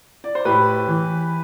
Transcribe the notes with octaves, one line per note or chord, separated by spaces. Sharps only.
D5
C5
A2 G4 B4
E3